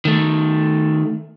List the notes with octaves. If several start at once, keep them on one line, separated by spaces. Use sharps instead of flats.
D#3 A3